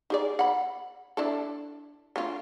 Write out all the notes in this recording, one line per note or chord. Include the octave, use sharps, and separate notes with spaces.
D#4 G#4 D5
F#5 B5
D4 E4 A4
A3 D4 F4